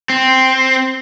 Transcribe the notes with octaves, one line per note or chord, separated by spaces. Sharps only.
C4